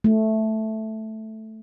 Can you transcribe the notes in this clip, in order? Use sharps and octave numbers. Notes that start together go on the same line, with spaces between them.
A3